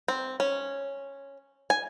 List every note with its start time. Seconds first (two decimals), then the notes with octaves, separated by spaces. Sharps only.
0.08 C4
0.40 C#4
1.70 G#5